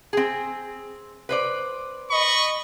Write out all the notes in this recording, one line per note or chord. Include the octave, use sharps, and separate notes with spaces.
C4 G#4
B4 C5 D5
D#5 B5 C#6